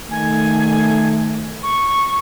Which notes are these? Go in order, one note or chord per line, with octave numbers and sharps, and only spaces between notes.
D#3 A3 G#5
C#6